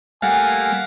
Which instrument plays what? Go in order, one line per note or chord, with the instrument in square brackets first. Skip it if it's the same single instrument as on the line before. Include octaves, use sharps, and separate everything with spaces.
[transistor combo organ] G3 A3 A#3 [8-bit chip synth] F5 F#5 [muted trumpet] G#5